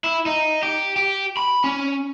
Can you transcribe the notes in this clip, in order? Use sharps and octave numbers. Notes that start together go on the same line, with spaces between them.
E4
D#4
G4
G4
B5
C#4